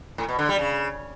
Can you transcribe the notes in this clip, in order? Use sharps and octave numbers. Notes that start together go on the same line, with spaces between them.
A2
B2
D3
G3
C#3